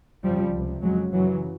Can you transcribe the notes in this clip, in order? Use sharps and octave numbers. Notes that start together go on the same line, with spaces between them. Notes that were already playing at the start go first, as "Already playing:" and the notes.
F2 C#3 F3 G3
C#2 C3
F2 C#3 F#3 G#3
F#2 C#3 E3 F#3